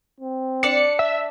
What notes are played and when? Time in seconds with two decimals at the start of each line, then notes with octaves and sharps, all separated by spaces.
0.20 C4
0.63 D4 D5 C#7
0.99 E5